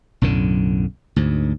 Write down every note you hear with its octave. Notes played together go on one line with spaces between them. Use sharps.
B1 F#2 A2 D3
D2 G#2